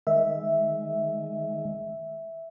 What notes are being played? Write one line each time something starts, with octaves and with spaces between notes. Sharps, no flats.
D#3 G#3 E5